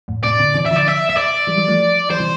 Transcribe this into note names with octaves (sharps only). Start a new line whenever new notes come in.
F2 A2
A2 C3 D5
B2 D3
C3 E3
D3 F3 E5
D5
E5
E5
D5
E3 G3
E3 G3
F3 A3
E3 G3 C5
C3 E3